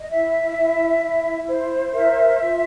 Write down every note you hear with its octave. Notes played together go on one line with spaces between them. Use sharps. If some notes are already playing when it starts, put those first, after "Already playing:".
D#5
E4 E5
E4
E4
C5
A#4 E5
F4